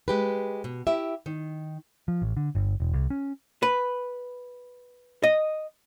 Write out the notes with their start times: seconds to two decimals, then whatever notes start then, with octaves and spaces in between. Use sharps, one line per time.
0.08 G#3 G4 B4
0.64 B2
0.87 E4 G4 E5
1.26 D#3
2.08 F3
2.22 A1
2.37 D3
2.55 G1
2.80 E1
2.93 C2
3.10 C#4
3.63 B4
5.23 D#5